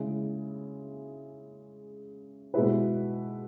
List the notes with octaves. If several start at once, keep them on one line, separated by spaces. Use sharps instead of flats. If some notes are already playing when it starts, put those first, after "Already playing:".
Already playing: C#3 G#3 E4 G#4
B2 G#3 E4 B4